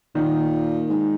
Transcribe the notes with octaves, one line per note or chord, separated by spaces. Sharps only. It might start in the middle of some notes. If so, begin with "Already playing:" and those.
A#2 D#3
G#2